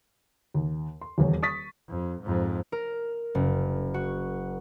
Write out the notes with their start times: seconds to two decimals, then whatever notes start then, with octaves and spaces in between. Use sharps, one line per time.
0.54 D#2
1.01 C6
1.18 D#1 E2 C#5
1.43 C#6 D#6 A6 B6
1.89 F2
2.22 F2 G#2
2.72 A#4
3.35 F#1
3.94 F#4